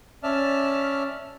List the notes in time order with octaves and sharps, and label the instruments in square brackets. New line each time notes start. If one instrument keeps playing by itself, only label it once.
[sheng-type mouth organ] C#4 D5 E5 A5 F6